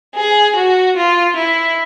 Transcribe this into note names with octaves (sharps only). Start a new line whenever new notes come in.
G#4
F#4
F4
E4